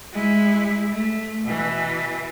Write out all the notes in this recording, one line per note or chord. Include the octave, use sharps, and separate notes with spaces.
G#3 E4
A3
B2 E3